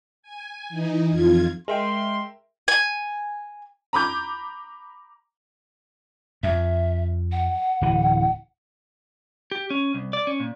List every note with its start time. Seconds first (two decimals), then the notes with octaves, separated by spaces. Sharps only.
0.23 G#5
0.69 E3 D#4
1.09 F2 F4 G#6
1.68 G#3 A#4 E5 G5 C6
2.68 G#5
3.93 A#5 B5 D6 G6
6.43 F2 E5
7.32 F#5
7.82 D1 E3
9.51 G4
9.70 C#4
9.94 C2
10.13 D5
10.27 C#4
10.40 A#2